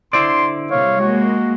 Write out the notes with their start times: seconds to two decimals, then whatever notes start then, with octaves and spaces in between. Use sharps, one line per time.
0.13 D3 E4 C5 D5 C6
0.71 C3 G3 A#3 C#5 F5
1.00 G#3 A#3 F#4